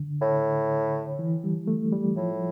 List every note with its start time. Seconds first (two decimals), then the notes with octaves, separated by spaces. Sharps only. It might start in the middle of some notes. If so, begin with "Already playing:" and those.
Already playing: D3
0.22 A2
1.19 E3
1.44 G3
1.67 A3
1.93 G3
2.16 A2 F3